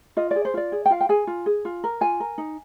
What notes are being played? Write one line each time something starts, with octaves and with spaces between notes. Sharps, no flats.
F4 D#5
G#4 D5
C5
F4 D5
G#4
G5
F4 F5
G5
G#4 G#5
F4
G#4
F4
A#4
F4 G#5
A#4
D#4